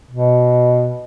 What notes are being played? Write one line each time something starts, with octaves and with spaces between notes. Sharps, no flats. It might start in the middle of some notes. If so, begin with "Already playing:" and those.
B2